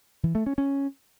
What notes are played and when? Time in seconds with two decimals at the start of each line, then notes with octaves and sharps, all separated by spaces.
0.23 E3
0.35 A3
0.46 C#4
0.58 C#4